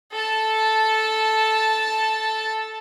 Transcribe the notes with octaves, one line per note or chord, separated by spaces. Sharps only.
A4 A5